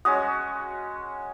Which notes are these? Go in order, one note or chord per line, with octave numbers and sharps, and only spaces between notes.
G#3 C#4 F#4 D#6